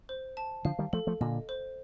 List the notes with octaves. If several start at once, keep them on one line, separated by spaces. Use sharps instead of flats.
C5
A5
D3 F3 F5
D#3 G3
F3 A3 A4
F3 A3
A#2 D3 D#5
C5